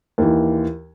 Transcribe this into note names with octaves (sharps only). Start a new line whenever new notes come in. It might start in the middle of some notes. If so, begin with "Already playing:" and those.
D#2 E3